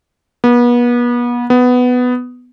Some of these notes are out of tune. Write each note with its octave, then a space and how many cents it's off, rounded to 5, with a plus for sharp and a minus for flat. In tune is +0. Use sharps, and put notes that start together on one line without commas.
B3 -35
B3 +10